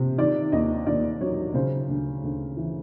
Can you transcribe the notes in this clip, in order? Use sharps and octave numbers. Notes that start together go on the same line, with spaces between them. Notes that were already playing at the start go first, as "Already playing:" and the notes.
Already playing: C3
D#3 D5
D#2 D#5
D#2 D5
F#3 C#5
C#3 C5
D2
D2
E3